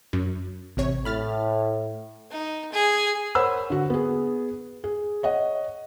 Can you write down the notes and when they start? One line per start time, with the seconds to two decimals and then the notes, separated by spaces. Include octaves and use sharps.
0.13 F#2
0.77 A1 C3 C#5
1.05 A2 B5 F6 A6
2.31 D#4
2.72 G#4
3.35 A#4 C5 C#5 F#5 B5 E6
3.70 D3 F#4
3.90 B3 G#4
4.84 G#4
5.23 C#5 D#5 F#5